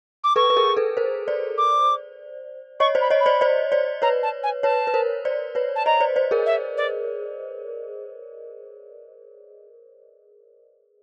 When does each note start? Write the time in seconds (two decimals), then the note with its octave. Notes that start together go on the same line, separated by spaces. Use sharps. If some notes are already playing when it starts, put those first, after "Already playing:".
0.24 D6
0.36 A4 B4 C#6
0.50 B4
0.57 G#4 A#4
0.77 A4 B4
0.97 A#4 C5
1.28 C5 D5
1.58 D6
2.80 C#5 D#5 C#6
2.95 C5 D5
3.01 B5
3.10 C#5 D#5
3.20 B5
3.26 C5 D5
3.41 C5 D5
3.72 C5 D5
4.02 B4 C#5 A#5
4.23 A5
4.43 G#5
4.63 B4 C#5 A5
4.87 B4
4.94 A#4 C5
5.25 C5 D5
5.55 B4 C#5
5.76 A5
5.86 C#5 D#5 A#5
6.00 C5 D5
6.16 C5 D5
6.31 G#4 A#4
6.46 E5
6.77 D5